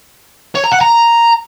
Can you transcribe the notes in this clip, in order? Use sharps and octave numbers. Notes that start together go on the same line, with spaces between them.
C#5
A#5
F#5
A#5